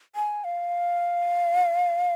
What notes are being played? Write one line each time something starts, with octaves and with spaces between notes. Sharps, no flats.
G#5
F5